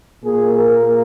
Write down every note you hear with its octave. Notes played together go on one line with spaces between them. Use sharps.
A#2 A#3 G#4
A#4